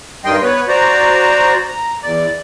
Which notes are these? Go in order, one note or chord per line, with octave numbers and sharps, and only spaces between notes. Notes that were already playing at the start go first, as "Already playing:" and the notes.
G2 D#3 G3 D#5 G5 C6
B3 B4 C#5
F#4 C5 D5 A#5
A#5
E2 D5